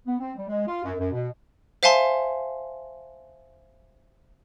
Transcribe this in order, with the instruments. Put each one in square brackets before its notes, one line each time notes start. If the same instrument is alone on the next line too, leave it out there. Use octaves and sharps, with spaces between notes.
[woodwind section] B3
C4
G3
G#3
F4
F#2
F#2
B2
[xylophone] C5 E5 F5 G#5 A5 C6